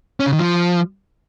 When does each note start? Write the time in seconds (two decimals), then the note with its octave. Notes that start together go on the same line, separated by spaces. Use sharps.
0.20 C#4
0.26 C#3
0.33 D#3
0.39 F3